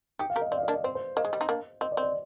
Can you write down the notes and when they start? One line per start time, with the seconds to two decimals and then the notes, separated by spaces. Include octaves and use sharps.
0.19 D#4 G4 G5
0.30 F5
0.36 G4 A#4
0.42 D#5
0.52 C4 D5
0.58 F5
0.63 D#5
0.68 A#3 D4
0.74 D5
0.84 C4 C5
0.95 C5
1.17 A#3 D#5
1.25 G#3
1.33 G3
1.41 C4 D#4
1.49 A#3 D4
1.81 C4 D#5
1.92 D5
1.97 C4
2.03 D5